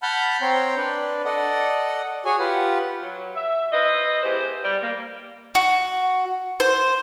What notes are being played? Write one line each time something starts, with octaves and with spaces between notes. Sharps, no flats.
F#5 A5 B5 F6 G6
C4 C#5 G5 A#5 C6
D4 B4 D5
A4 D5 D#5 F#5
F#4 G#4 C#5 G#5
F4 G4 B4 F#5
F#3
E5
E4 B4 C5 D#5
G#3 B3 E4 G4 G#4 C5
G3
A#3
F#4
C5